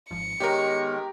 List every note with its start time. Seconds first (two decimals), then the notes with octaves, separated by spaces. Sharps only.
0.11 G#1 G#2 F3 C#7
0.40 D#3 G#3 B3 G4 A#4 C#5 D#5